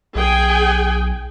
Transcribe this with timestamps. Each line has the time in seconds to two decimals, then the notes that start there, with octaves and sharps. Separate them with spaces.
0.15 B1 G#4 G5 G#5